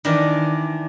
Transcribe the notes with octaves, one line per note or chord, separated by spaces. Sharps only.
D#3 E3 D4 D5 D#5